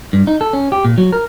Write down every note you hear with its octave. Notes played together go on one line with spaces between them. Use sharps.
G2
D#4
A4
C#4
G4
A#2
F#3
A#4